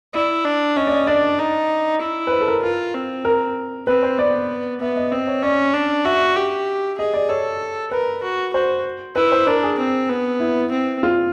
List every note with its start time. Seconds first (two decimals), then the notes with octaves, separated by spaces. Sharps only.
0.14 E4 D5
0.45 D4
0.76 C#4 D#5
0.87 D5
0.92 D#5
1.07 D4 D5
1.39 D#4
2.01 E4
2.27 B4
2.32 C5
2.41 A4
2.48 A#4
2.63 F4 A#4
2.94 C4
3.25 A#4
3.87 C4 B4
4.03 C5
4.18 B3 D5
4.81 B3 E5
4.96 D#5
5.12 C4 D#5
5.27 C#5
5.43 C#4 D5
5.74 D4
6.05 F#4 E5
6.36 G4
6.98 G#4 D#5
7.14 D5
7.29 A4 C#5
7.91 A#4 B4
8.23 F#4
8.54 F#4 C5
9.16 E4 B4
9.32 C5
9.47 D4 A#4
9.63 G#4
9.79 C4
10.09 B3
10.40 E4
10.72 C4
11.03 F4